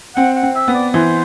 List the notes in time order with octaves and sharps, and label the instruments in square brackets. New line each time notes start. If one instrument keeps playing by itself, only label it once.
[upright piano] C4 [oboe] F#5
[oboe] F#5
[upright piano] C4
[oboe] E5
[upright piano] B3
[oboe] D5
[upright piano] E3 [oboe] C5